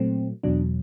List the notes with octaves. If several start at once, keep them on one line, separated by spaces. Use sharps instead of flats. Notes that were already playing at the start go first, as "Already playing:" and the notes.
Already playing: A#2 F#3 A3 C4
E2 B2 F#3 D4